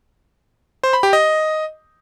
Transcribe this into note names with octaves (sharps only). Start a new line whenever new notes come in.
C5
B5
G4
D#5